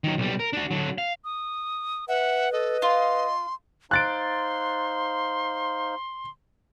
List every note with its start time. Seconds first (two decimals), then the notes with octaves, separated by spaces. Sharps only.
0.04 D#3 F#3
0.18 B1 G3
0.39 A#4
0.53 D4 F#4
0.71 D3 F#3
0.98 F5
1.24 D#6
2.08 B4 E5 F#5
2.52 A4 D#5
2.82 F4 C6
3.91 D#4 C5 F5 C6 F#6 A6 D7